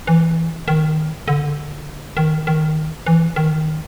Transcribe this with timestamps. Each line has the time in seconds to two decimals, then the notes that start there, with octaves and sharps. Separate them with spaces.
0.07 E3
0.68 D#3
1.28 D3
2.17 D#3
2.47 D#3
3.06 E3
3.36 D#3